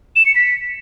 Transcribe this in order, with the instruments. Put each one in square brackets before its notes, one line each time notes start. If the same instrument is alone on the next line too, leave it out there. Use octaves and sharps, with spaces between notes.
[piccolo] E7
C#7
B6